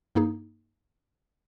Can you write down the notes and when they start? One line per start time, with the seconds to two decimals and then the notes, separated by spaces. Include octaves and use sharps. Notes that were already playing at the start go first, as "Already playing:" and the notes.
0.15 G2 A#3 D#4 G#4